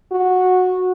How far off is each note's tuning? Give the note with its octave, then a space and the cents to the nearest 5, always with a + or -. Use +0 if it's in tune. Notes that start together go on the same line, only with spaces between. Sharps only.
F#4 -15